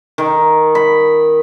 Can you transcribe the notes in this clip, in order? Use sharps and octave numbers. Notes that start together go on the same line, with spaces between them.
D#3
B5